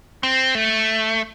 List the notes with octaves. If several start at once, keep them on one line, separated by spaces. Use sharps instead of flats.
C4
A3